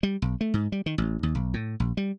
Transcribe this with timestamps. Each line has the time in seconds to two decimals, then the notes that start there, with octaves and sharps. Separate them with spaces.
0.03 G3
0.22 B1
0.41 A3
0.54 G#2
0.72 G3
0.86 D#3
0.98 A1
1.23 D#2
1.35 B1
1.54 A2
1.80 A#1
1.97 G3